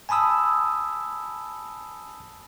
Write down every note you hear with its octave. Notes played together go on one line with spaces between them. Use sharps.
G#5 A5 B5 D#6 E6